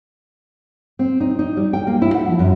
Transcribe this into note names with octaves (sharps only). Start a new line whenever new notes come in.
C4
D#4
D#4
G3
G5
A#3
E4
F#5
F3
F#2